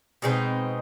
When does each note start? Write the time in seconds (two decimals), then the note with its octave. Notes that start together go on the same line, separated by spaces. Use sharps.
0.22 B2 G#3 C4 D#4